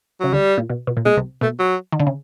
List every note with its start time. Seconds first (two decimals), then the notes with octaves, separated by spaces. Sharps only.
0.20 C#3 F#3
0.32 D2 D3 G3
0.58 A#2
0.70 B2
0.87 B2
0.97 A#2
1.05 B2 G#3
1.17 C2 C3
1.41 B2 A3
1.59 F#3
1.92 D#3
2.00 D3
2.07 C#3